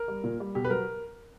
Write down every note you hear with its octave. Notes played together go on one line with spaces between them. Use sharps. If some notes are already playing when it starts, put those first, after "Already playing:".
Already playing: A#4
G3
A#2
G3
B2 G4
B4
F#3 A#4